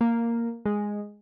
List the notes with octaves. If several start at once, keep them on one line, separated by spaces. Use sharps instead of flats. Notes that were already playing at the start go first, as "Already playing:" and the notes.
A#3
G#3